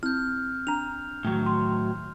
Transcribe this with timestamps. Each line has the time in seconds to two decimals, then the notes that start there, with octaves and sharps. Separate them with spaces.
0.03 C4 E4 F6 G6
0.67 D4 A#5 F7
1.25 A2 D#3 F#3
1.46 C6